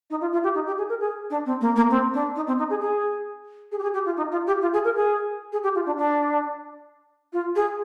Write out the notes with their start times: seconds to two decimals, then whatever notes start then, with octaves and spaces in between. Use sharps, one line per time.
0.10 D#4
0.21 F4
0.32 F4
0.43 G4
0.55 D#4
0.67 G4
0.78 G#4
0.89 A#4
1.00 G#4
1.30 D4
1.46 C4
1.61 A#3
1.76 A#3
1.91 C4
2.14 D4
2.36 D#4
2.47 C4
2.58 D#4
2.70 G#4
2.81 G#4
3.72 G#4
3.79 G4
3.83 G#4
3.94 G4
4.05 F4
4.17 D#4
4.32 F4
4.47 G4
4.62 F4
4.73 G#4
4.84 A#4
4.96 G#4
5.52 G#4
5.63 G4
5.75 F4
5.86 D4
5.97 D4
7.33 F4
7.56 G#4